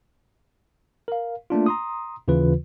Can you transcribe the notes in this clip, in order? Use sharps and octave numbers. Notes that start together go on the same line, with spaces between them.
A#4 F5
A3 A#3 D4 F4
A#5 C6 D#6
D#2 C#3 E3 F4 B4